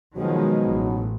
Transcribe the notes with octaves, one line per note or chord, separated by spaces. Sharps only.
B2 D#3 F3 F#3 G#3 D#4
A1